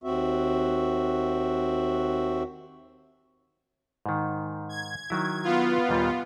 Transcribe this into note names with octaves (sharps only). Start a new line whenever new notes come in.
D#2 C4 F#4 E5
G#2 D#3
G#6
D#3 F#3 E4
B3 F4
D#2 A#2 G3